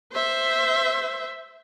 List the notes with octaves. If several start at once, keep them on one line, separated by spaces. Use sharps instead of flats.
C5 E5